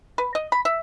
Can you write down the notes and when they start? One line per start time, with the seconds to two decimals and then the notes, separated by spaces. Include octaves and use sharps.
0.18 B4
0.35 D#5
0.52 B5
0.65 E5